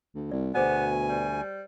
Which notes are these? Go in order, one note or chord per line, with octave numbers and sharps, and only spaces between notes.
D2
C2 D5
D2 B2 B3 G#4 C5 D5 G#5
G3